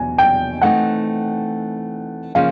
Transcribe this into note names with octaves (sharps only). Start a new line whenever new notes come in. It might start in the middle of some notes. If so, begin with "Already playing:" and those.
Already playing: E2 B2 F#3 G#5
G5
E3 A3 C4 D#4 F#5
C#3 F3 A#3 C#4 F5